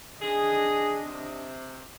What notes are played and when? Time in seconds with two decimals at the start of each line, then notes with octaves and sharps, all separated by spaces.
0.21 D4 G#4 D#5
1.04 C3